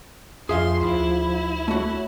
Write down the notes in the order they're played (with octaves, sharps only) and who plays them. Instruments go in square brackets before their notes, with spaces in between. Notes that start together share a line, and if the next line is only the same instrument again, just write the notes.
[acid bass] F2 [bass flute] F3 [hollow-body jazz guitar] G#4 E5 F5 [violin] C6
[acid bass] D2 [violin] E4
[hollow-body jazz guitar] A3 F#4 [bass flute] C#5